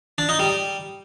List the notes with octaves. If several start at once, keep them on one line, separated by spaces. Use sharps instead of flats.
D4
D#4
G3